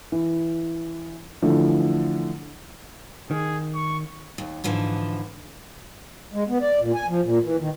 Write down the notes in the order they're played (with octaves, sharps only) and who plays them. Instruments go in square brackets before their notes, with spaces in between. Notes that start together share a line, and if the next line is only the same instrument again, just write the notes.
[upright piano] E3
D3 E3 F3 A3
[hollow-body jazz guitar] D#3 [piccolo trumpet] G#4
[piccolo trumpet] C#6
[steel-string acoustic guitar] D#2
G#2 D3 E3 F3
[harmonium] G#3
B3
D5
A#2
G#5
F3
A#2
E3
D#3